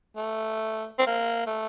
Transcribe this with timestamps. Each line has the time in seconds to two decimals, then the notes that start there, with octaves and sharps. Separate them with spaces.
0.16 A3
0.99 C4
1.07 A#3
1.47 A3